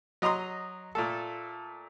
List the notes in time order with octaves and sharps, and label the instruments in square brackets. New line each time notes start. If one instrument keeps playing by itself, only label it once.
[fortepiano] F#3 D#5 A#5 C6 D#6
A#2 A3 A4